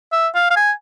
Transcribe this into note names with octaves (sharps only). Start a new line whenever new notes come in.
E5
F5
F5
G#5